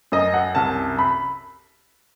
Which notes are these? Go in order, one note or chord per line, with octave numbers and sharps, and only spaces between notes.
F#2 D#5
F#5
C2 A5
B5